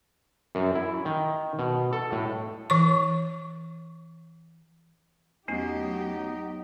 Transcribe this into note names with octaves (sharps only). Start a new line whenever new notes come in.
F#2
E4
D#3
B2
A4
A2
E3 C#6
E2 F#3 A3 B3 C#4 D#4 G4